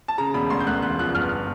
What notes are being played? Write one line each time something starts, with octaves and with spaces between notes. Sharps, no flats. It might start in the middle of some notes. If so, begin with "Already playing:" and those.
A5
C#3 A#5
E1 B5
D2 C6
G6
D2 F#6
E1 F#6
F3 F#6
G1 F6